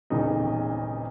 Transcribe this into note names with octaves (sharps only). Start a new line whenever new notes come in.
D#1 G#1 E2 C#3 D#4